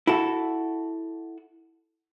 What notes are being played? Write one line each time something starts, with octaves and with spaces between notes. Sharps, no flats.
E4 F#4 A4